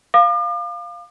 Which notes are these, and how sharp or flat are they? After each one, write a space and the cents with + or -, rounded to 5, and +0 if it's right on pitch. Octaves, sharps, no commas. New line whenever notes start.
F5 +0 D6 +40